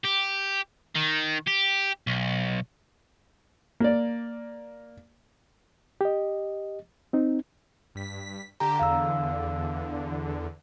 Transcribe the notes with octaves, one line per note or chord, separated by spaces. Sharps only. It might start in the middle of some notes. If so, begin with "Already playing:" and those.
G4
D#3
G4
B1
A#3 D5
G4 D#5
C4 D#4
G2 B6
D3 G4 A#5
E2 D3 F5 E6